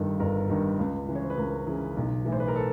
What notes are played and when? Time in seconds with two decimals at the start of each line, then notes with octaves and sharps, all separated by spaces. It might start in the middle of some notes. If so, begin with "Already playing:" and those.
Already playing: G1 G2 D#3 A4
0.20 G1 A#4
0.49 G2 D#3
0.79 C#2
1.08 C#3 E3
1.15 C#5
1.23 C5
1.30 B4
1.37 C#2 A#4
1.67 C#3 E3
1.96 B1
2.25 A2 E3
2.32 C5
2.40 B4
2.48 A#4
2.56 A4